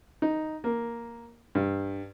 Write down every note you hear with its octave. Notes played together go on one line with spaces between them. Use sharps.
D#4
A#3
G2